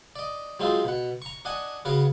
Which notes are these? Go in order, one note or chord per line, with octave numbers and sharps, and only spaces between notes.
D5 D#5
F#3 G#3 C4 D#4 F4
B2 F#5
A#5 C#6
D4 D#5 F#5 G#5
C#3 B3 F#4 A#4